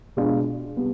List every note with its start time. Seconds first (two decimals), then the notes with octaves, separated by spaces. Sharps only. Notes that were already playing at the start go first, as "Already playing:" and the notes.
0.17 B2 G#3 B3 D4 F4
0.77 C3 G3 B3